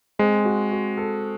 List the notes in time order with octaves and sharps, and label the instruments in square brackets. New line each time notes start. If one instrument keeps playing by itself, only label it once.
[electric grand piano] G#3 [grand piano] C4
[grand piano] F#4
F#4
A4